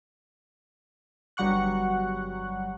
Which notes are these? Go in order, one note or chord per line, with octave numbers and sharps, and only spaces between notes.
G1 F#3 G3 F#5 C#6 F#6